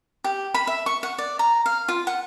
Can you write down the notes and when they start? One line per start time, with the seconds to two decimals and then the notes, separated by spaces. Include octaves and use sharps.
0.24 G4
0.54 B5
0.67 E5
0.86 C#6
1.03 F#5
1.18 D5
1.39 A#5
1.66 F5
1.88 F4
2.07 F#5